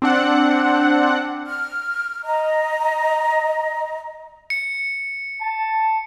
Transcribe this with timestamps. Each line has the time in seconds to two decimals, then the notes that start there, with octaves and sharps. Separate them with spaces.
0.02 C4 D4 F#5
1.46 F6
2.24 D#5 A#5
4.50 C#7
5.42 A5